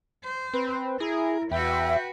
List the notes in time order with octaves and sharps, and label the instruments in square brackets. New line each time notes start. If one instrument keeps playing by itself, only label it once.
[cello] C5
[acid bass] C4 [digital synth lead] B4
[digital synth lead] E4 [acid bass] G#4 [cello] A#4
[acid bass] E2 [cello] F#4 B4 [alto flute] E5 [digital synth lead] G5